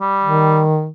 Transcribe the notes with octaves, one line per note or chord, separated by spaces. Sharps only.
G3
D#3